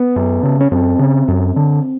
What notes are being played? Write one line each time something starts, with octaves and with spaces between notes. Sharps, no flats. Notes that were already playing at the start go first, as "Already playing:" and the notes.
Already playing: B3
F#2
C#3
C#4
F#2 C4
C#3
F#2
D3